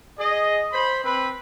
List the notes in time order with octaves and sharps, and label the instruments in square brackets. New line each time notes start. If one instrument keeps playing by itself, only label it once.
[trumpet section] G#4 D#5
C5 B5
C4 B4 B5